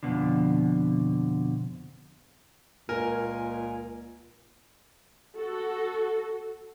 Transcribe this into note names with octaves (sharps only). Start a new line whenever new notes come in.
F2 G#2 B2 D3
C#2 A#2 A#4 G#5
F#4 A4